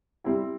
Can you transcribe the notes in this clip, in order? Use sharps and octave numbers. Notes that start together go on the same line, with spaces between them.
G3 C4 E4 G4